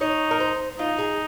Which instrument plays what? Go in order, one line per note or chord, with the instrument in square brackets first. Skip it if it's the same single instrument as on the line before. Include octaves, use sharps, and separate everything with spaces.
[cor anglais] D#4 [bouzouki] C#5
[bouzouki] A#4
C5
[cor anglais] D#4 [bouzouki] F4
[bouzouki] G#4